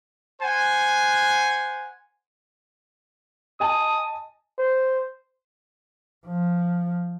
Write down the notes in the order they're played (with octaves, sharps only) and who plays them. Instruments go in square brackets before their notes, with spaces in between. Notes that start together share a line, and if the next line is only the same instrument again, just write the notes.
[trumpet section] C5 F#5 G#5
[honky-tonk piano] D#5 G#5 A5 [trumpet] D#6
[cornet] C5
[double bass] F3